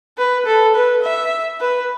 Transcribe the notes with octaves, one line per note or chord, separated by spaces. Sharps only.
B4
A4
B4
E5
B4